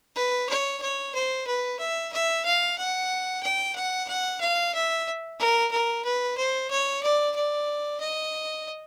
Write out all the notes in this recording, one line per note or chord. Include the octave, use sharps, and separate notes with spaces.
B4
C#5
C#5
C5
B4
E5
E5
F5
F#5
G5
F#5
F#5
F5
E5
A#4
A#4
B4
C5
C#5
D5
D5
D#5